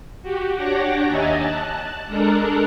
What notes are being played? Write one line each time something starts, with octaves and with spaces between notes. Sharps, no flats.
F#4 G4
D4 G4 C#5 F#5 D6 A#6
D#2 D#5 E5 G#5 A#5 A6
A5 F#6
G#3 D4 A4 A#4 A#5 F#6